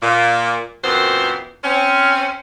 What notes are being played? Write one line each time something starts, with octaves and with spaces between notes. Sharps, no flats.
A#2
F#2 A#2 E3 B3 C4 C5
C4 C#4